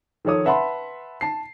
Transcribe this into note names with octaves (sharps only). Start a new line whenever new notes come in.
D#3 F3 A4 C#5 D#6
B4 E5 F#5 A5 B5 C6
A5 C7